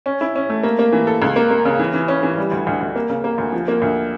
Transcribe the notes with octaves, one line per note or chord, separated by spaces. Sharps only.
C#4
E4
C#4
A3
A#3
A#3
E3
A4
C#2
A#3
A#3
C#3
E3
E3
C#4
E3
G3
D2
D2
D2
A#3
C#3
A#3
D2
F3
A#3
D2